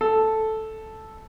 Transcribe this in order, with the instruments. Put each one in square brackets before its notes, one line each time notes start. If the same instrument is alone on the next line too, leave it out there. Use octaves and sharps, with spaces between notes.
[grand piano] A4